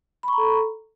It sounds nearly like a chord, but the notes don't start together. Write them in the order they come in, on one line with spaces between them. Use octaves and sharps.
B5 C#6 A#5 A4